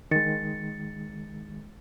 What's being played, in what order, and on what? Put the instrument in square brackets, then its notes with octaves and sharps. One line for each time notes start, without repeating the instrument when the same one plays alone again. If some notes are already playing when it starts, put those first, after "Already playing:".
[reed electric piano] D#3 G#3 [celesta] A6 C#7